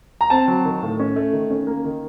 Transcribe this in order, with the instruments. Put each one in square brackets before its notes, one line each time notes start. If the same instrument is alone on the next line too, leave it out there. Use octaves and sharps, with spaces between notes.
[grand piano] A#5
C4 A5
F#3
D#3
A2
C#4
A3
D#3
C#4
A#3
D#3